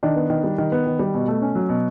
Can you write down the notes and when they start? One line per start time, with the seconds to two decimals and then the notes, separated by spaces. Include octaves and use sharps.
0.03 D#3 D4
0.16 B3
0.30 D#3
0.44 G3
0.58 D#3
0.72 B3
0.87 D#3
0.99 G3
1.14 B2
1.28 A3
1.42 C#4
1.55 F#3
1.69 B2